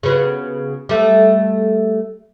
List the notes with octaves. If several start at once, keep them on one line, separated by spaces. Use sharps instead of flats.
C#3 B3 F#4
G3 A3